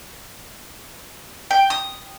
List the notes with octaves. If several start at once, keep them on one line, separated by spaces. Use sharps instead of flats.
G5
D#6